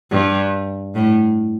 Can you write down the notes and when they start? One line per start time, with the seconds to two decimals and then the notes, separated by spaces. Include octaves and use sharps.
0.11 G2
0.95 A2